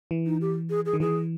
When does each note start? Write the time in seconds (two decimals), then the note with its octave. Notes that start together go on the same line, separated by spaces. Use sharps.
0.11 E3
0.26 D#4
0.41 G4
0.70 G#4
0.86 G#4
0.94 D#3
1.00 E3 G#4